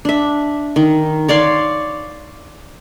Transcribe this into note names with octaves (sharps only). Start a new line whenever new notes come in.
D4 E5
D#3
C#5 D5 F5 C6